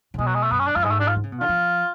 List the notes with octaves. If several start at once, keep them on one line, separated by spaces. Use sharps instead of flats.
C#3
B2 G#3
F#3
G#3
A3
F#2 B3
C#4
D4
F#2 F4
G#2 G#3
A3
D4
F4
D3
C#3
B2
D3 F4
F3